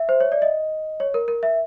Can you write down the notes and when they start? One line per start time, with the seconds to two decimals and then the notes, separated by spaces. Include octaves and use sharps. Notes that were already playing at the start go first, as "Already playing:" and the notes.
Already playing: E5
0.09 C5
0.20 C#5
0.32 D5
0.42 D#5
1.00 C#5
1.14 A#4
1.28 A#4
1.43 E5